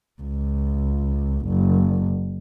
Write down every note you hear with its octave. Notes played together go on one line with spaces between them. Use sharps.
C#2
F#1